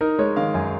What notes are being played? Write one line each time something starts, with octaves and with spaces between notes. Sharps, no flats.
D#4 A#4
G#3 C#5
D#3 F5
F#2 G#5